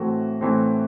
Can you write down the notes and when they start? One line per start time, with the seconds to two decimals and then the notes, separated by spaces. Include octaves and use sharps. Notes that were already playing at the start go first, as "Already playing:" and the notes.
Already playing: A2 E3 A3 C4 F#4
0.41 A2 E3 A3 C4